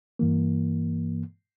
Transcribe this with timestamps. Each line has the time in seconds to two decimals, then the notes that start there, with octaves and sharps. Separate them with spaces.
0.19 G2 E3 A#3